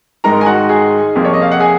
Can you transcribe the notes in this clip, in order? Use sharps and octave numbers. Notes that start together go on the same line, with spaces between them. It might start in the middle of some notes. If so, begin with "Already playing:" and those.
G#2 D#3 G#3 D#4 A#4 A#5
G#5
F#4 F#5
G#4 G#5
F2 C3 F3 A#3
C#5
D#5
F5
F#5
G#4 G#5